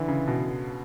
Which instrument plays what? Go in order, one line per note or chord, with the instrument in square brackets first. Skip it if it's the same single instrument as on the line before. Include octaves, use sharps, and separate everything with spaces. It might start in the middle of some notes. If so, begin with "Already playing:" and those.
Already playing: [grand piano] D3 [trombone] E3
[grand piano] C#3
B2